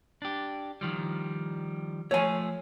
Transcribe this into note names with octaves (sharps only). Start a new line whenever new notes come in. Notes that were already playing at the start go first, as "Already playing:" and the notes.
D4 G4
D#3 F3 G3
F3 A3 C#5 G#5